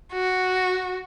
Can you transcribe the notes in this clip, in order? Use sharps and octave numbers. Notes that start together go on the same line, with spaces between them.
F#4